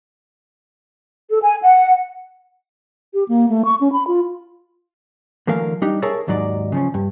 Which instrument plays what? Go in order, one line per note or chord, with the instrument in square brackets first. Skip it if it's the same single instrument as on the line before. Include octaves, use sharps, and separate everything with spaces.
[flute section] A4
G#5
F#5
[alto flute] G4
A#3
A3
C#6
C#4
B5
F4
[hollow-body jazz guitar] D3 E3 F#3 A3 A#4 F5
G3 D4 D#4 G4
G#4 A#4 C#5 E5 A5 A#5
D#2 G#2 F#3 D#4 D5
C#3 F3 C#4
G2